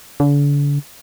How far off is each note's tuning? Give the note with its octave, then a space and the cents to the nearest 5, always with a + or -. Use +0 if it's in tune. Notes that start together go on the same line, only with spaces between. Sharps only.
D3 -40